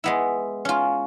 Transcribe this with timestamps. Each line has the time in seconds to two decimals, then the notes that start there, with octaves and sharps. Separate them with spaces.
0.04 G#3 B3 E4
0.65 C#4 F4